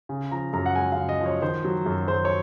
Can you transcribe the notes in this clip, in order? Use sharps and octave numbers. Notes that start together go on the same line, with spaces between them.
C#3
F3 A#5
F#2 A#5
F#5
G#3 G#5
F5
C#3
D#5
F3
C#5
D#3 C5
F#3
F#2
F#2 C5
C#5